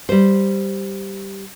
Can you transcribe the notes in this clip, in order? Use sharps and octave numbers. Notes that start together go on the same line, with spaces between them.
G3 C5